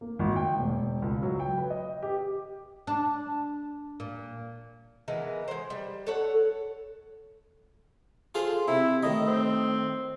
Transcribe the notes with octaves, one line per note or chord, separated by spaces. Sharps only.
A#3
G#1
G5
E1
C#2
F#3
G5
B4
D#5
G4
D4
A#2
E3 G#3 B3 A#4
G#3 C5
G3
A4 C#5 F#5
F4 G#4 A4 C5
C3 E4
A2 D#3 D#5
C4